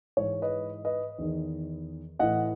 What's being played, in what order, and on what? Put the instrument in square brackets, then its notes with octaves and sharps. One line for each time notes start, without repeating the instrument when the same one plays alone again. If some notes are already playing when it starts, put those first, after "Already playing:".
[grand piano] G#2 E3 C#5
B4 D#5
B4 D#5
E2 D#3
A2 E3 D#5 F#5